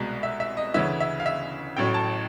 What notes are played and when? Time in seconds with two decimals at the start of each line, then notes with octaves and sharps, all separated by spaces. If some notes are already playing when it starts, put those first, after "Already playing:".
Already playing: C2 B2 G#3
0.23 E5
0.40 E5
0.57 D#5
0.74 D2 C#3 E3 E5
1.00 E5
1.20 F5
1.26 E5
1.77 A1 A2 F#3 G5
1.94 A5